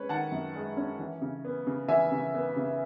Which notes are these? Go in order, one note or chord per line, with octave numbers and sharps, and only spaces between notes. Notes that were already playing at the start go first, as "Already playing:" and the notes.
Already playing: G#3 C#4 B4 C#5
D#3 F#5 A5
F#2
G#3
C#4
E3
C#3
B3
C#3
E3 E5 G#5
C#3
B3
C#3